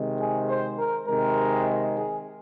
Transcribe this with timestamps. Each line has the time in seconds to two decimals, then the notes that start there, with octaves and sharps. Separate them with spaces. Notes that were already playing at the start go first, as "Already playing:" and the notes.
Already playing: C3 D#3 G#3
0.19 G#4
0.48 C5
0.78 A#4
1.07 C3 D#3 G#3 A#4
1.97 G#4